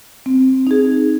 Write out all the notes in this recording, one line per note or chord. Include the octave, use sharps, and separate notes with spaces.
C4
D#4 G#4